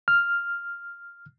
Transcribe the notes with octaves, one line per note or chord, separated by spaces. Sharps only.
F6